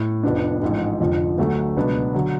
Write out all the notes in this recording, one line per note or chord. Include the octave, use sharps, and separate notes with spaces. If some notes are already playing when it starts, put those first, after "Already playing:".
Already playing: A2
F1 F2 F3 B3 D4
A1 G#2 F3
F1 F2 D3 F3
D2 D3 F#3 A3
C#2 B2 F#3 B3 D4
D3 F#3